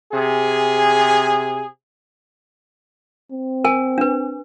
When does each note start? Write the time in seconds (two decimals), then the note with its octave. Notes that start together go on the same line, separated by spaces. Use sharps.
0.12 C3 G#4
3.31 C4
3.64 A#4 G#5
3.98 D4 B4